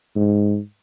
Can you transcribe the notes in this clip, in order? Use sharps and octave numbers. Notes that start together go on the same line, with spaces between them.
G#2